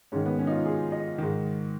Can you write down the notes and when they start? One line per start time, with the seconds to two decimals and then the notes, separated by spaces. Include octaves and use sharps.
0.12 G#2 D#3 C#4
0.26 B3
0.39 C#4
0.47 D#4
0.52 F4
0.66 G#4
0.92 D#5
1.18 G#2 D#3